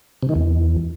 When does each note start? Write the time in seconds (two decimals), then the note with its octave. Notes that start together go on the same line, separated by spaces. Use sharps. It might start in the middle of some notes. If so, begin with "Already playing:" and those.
0.23 C3
0.29 D#3
0.35 E2